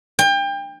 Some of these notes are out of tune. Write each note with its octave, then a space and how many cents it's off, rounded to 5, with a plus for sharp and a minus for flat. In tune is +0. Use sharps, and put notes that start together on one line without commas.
G5 +30